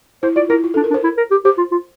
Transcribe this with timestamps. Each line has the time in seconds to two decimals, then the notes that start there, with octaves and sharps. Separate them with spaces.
0.23 E4 C5
0.36 F4 D5
0.50 E4 A#4
0.64 F4
0.74 D4 A4
0.84 A#4
0.91 D4
0.94 C5
1.04 E4
1.17 A#4
1.31 G4
1.45 G4 C5
1.58 F4
1.72 F4